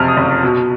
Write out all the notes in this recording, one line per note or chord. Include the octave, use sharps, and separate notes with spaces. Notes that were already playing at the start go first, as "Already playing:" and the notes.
Already playing: F#1 F2 C3 F6
D#6
F#1
B2